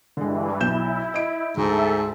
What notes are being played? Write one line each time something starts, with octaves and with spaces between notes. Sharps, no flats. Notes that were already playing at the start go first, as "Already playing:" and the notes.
G2 D3 E3 G#3
B1 E4 G6 E7
D#5 E5 D7
D2 G#2 A4 E5